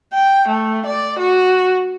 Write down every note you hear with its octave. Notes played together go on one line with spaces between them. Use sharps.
G5
A3
D5
F#4